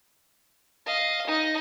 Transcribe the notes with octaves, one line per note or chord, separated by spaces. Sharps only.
D#5 F5
D#4 D#5